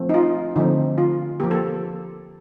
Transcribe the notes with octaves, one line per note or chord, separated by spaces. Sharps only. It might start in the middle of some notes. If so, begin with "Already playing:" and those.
Already playing: F3 A3 C4
D#4
F4
D3 F3 A3 C4 D#4
F4
F3 A#3 G4
A4